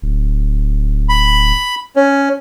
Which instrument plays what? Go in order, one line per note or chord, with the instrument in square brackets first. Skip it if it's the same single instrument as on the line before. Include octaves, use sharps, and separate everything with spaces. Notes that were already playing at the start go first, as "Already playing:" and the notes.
[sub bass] D1
[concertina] B5
C#4